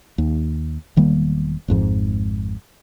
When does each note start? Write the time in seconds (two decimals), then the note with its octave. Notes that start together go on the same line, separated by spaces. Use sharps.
0.18 D#2
0.96 E1 D#3 G3 A#3
1.68 G#1 F2 G#2 F3